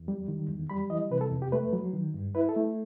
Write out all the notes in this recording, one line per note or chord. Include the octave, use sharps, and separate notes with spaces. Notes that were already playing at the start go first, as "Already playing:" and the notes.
Already playing: E2
G3
D#3
E2
G3 B5
E3 D#5
C3 B4
A4
E2
G4
A3 B4
F#3
D#3
G2
E4 B4
A4
A3